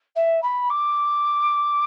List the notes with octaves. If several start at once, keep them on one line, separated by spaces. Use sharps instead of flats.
E5
B5
D6